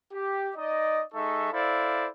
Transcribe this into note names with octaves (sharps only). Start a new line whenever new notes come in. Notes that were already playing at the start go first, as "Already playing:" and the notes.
G4
D#4 D5 D#5
G#3 D#4 A4 E5 C#6
E4 A4 C5 D5 F5